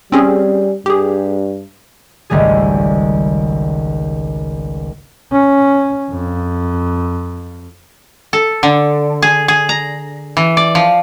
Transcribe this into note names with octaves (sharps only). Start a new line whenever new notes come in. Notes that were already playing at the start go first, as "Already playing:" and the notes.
G3 C4 C#4 G#4
G2 G4 G#4
G#1 C#2 G3 A3 G#4
C#4
F2
A4
D3
G#4
G#4
A#5
E3
D5
F3